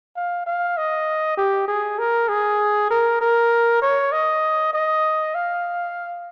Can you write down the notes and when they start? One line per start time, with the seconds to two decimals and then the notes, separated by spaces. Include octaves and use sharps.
0.16 F5
0.46 F5
0.77 D#5
1.37 G4
1.68 G#4
1.99 A#4
2.29 G#4
2.90 A#4
3.21 A#4
3.82 C#5
4.12 D#5
4.73 D#5
5.34 F5